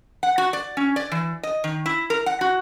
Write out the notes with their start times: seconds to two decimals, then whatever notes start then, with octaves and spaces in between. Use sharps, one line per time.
0.23 F#5
0.38 F#4
0.53 D5
0.77 C#4
0.96 D5
1.12 E3
1.43 D#5
1.64 D#3
1.86 E4
2.10 A#4
2.26 F#5
2.41 F#4